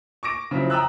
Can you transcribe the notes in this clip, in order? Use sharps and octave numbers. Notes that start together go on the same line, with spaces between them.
C#6 D6 A#6 D7
C#3 F3 F#3 E4
G5 A#5 D#6 E6 F#6